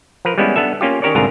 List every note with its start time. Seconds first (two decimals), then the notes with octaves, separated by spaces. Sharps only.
0.25 F3 A#4 B4
0.38 G3 G#3 B3 C#4 E4
0.56 B3 D4 A4 E5
0.81 A#3 C#4 F4 G4
1.02 D#3 C#4 G4 A#4 C#5 D5
1.15 C2 G#2 D3 F4 G#4 A#4